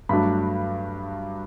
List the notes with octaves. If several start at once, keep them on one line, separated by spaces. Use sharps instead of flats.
G2 F#3 A3 D4 B5